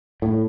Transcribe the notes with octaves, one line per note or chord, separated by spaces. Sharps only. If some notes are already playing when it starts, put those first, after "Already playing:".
A2